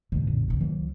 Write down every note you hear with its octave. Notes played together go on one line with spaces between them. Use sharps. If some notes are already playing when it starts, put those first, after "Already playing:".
E2 G#2 B2 D3
B1 F#2 A#2
B2 D3
C#2 D#3 F#3 A#3